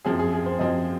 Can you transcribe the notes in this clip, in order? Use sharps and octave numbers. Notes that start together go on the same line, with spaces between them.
F#2 F3 C4 G#4
G#4
G#4
C5
F#2 F3 C4 D#5